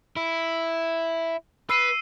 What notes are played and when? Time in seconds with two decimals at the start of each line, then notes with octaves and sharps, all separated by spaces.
0.16 E4
1.70 B4 E6 C7 D#7